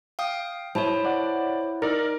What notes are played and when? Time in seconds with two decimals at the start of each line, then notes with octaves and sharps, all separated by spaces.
0.19 F5 G5 D#6
0.75 E4 C5 C#5 A5
1.05 D5 F#5
1.82 D#4 A#4 D5